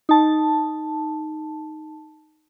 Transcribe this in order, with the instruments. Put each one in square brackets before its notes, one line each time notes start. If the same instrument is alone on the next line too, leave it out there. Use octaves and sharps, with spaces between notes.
[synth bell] D#4 A5